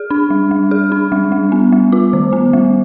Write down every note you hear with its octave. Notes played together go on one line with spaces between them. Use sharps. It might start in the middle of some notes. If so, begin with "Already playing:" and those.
Already playing: G#4
D4
G3
G3
G#4
D4
G3
G3
B3
G3
F4
D#3
B3
G3